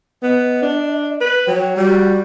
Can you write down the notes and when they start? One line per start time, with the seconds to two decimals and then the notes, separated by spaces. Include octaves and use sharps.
0.23 B3 D#5
0.62 D4
1.21 B4
1.48 F#3 G5
1.77 G3 F#4